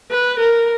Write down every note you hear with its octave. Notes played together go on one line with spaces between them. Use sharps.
B4
A#4